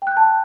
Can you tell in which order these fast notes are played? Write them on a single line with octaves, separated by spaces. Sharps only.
G5 F#6 G6 A5